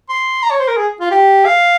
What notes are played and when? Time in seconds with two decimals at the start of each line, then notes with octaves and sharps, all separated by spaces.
0.09 C6
0.43 A#5
0.51 C#5
0.59 C5
0.68 A#4
0.77 G#4
1.01 F4
1.11 G4
1.45 F5